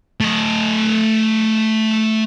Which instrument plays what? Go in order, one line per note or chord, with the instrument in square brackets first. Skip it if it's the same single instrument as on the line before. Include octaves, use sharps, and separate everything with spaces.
[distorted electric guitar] A3 D#5